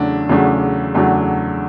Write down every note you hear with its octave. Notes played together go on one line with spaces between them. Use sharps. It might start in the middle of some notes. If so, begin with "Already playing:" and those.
Already playing: E2 C#3 F#3 A3 D4
E2 C#3 F#3 A3 D4
E2 C#3 F#3 A3 D4